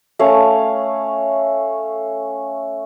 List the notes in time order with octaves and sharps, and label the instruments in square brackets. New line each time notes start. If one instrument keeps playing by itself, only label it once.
[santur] A3 C#4 F5